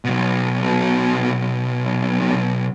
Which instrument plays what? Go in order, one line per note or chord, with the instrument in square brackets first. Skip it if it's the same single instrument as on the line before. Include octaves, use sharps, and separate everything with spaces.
[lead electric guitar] B1 B2